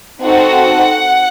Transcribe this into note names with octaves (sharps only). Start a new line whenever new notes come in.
C4 D#4 F#4 A4 F#5